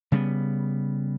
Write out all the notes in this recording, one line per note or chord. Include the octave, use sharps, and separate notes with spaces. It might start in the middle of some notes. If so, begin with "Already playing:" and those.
C#3 G3 A#3 B3